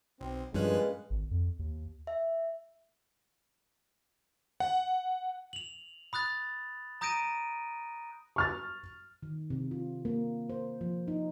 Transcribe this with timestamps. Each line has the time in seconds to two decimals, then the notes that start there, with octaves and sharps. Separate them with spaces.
0.21 B1 C4
0.54 G2 A#2 F3 G#3 C#4 B4 F#6
1.10 G#1
1.31 F2
1.59 D#2
2.07 E5
4.60 F#5
5.53 F7 F#7
6.13 B5 D#6 F#6 A6
7.01 A#5 D#6 G6 A#6 D7 D#7
8.36 C#6 F6 A6
9.23 D#3
9.50 C3
9.71 F4
10.05 A#3
10.50 C5
10.81 F3
11.08 D#4